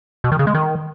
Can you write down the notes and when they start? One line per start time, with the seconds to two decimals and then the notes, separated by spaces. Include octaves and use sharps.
0.24 B2
0.32 D#3
0.39 C#3
0.47 G#3
0.55 D#3